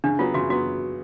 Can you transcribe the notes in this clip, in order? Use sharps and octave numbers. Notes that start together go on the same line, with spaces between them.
C#3 D4
F#3 B3 F4
C#3 F#4
F#3 B3 F#4